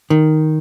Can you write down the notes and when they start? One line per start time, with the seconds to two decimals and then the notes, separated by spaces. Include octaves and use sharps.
0.10 D#3